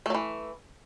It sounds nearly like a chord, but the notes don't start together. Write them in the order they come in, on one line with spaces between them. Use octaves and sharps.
A3 F#3 E3